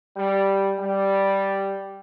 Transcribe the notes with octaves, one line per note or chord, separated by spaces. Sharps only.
G3
G3